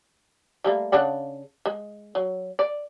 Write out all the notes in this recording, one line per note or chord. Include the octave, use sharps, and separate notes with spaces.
G3 A3 A#3
C#3 D4 F#5
G#3
F#3
D5